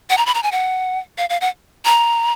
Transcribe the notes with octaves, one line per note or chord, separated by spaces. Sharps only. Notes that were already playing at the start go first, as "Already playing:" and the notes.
F#5
A#5
B5
A#5
G#5
F#5
F5
F5
F#5
A#5